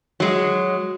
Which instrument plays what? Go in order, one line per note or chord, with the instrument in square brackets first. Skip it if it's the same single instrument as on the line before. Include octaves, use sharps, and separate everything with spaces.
[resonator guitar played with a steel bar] F#3 G#3